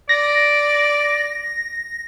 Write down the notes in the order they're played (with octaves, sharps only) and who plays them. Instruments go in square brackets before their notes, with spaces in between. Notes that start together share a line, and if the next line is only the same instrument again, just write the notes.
[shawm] D5 [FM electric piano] A#6